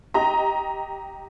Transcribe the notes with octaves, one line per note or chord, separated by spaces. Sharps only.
G4 D#5 A#5